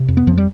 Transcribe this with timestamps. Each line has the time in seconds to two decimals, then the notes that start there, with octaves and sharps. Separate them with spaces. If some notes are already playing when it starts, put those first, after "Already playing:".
Already playing: C3
0.08 F2
0.17 B3
0.27 F2 F3
0.37 G3